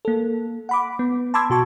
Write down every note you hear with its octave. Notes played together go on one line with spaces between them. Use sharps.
A#3 A4
F#5 B5 D6
B3
A5 B5 C6 D6 E6 G#6
B2 F#4 A5 C#6